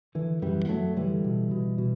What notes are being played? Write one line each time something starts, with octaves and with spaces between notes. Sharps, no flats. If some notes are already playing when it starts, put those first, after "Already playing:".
D3 E3
F#2 E3 G3
B3
F#2 F#3 A3
D3 E3 G3
B2
B2
B2